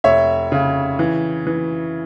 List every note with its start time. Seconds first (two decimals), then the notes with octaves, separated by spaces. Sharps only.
0.04 F1 C#5 E5
0.52 C#3
0.99 E3
1.47 E3